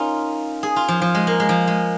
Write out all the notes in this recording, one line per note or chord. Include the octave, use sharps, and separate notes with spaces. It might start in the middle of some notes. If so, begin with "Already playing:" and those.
Already playing: A#3 C#4 D#4 F4
G#4
F4
F3
F3
G#3
A#3
G#3
F3
G#3